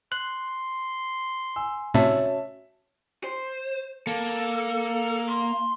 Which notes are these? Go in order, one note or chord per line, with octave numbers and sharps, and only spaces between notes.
C6 F#6
G#5 E6
A2 C3 C#4 F#4 C#5 E5 A5
C5
A#3 A4
C6